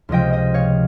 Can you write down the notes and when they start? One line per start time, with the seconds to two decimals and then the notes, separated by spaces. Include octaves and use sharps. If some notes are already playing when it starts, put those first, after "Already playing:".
0.09 C#2 C3 F3 D#5 G5
0.33 D#5 G5
0.54 C#5 F5